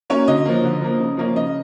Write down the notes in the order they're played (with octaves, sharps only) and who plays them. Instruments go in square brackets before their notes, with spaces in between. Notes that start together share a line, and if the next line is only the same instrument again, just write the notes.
[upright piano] F#3 A#3 C#4 C#5
D3 D#5
F3 A#3
D3
F3 A#3
C#3
F3 A#3 C#4
C#3 D#5